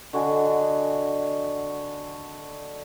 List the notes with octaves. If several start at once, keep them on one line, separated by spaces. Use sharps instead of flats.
D3 F#4 D#5 G#5